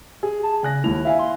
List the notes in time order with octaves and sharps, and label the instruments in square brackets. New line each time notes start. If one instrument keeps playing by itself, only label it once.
[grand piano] G#4
[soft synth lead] A5
[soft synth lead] C#3 [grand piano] G#5 F#6 A#6
[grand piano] D#2 F7 [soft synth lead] E4
[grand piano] E4 F5 G#5 [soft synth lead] E5
[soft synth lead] C6